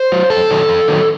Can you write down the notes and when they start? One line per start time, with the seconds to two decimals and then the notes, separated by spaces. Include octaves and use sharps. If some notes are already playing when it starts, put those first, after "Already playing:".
Already playing: C5
0.12 F#3
0.30 F2 A4
0.50 D#3 F#3
0.69 F2
0.88 D#3 F#3